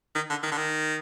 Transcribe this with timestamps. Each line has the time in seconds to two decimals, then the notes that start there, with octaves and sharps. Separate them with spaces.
0.15 D#3
0.30 D3
0.43 D#3
0.51 D3
0.57 D#3